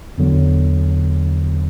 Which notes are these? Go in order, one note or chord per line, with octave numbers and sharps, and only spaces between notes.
E2 D3 F#3